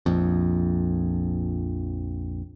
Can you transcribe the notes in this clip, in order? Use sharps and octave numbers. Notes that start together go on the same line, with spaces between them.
A#1 F2